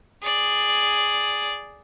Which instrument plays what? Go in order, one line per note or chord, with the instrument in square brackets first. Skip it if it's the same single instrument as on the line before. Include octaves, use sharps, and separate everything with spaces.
[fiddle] G#4 D5